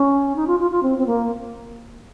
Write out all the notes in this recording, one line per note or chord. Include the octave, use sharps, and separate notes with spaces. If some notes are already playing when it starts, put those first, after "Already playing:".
Already playing: C#4
D#4
F4
F4
F4
C4
C4
A#3